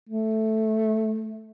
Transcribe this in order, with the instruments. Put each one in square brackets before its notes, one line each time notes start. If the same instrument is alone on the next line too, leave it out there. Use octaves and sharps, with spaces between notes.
[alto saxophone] A3